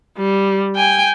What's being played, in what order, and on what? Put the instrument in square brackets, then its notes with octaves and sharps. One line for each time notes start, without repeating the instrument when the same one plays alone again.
[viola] G3
G5 G#5